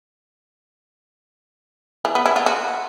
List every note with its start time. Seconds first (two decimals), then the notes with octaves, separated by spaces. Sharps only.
2.05 E3
2.15 B3
2.26 E4
2.36 F4
2.46 F#4